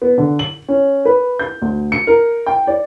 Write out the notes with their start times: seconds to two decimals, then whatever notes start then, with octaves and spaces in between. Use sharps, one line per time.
0.02 B3
0.18 D3
0.39 F#7
0.68 C#4
1.05 B4
1.39 G6
1.62 D2
1.92 C#7
2.07 A#4
2.46 G5
2.67 D5